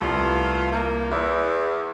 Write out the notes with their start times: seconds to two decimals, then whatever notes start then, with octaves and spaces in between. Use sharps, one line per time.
0.01 C2 A3 B3 F4
0.72 A#3
1.12 E2 E4